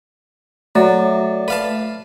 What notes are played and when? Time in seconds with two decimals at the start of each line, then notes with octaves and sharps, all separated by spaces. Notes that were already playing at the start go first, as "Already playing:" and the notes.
0.75 F#3 A3 D5
1.48 B4 F5 A5